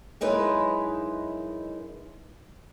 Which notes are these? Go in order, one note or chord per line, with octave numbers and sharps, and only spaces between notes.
F#2 G#3 D#4 E4 B4